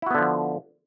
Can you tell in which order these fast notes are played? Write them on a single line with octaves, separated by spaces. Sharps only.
E4 F#4 B3 D3 F3